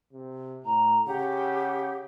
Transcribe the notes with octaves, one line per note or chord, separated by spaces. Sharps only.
C3
A2 A#5
C#3 G4 F#5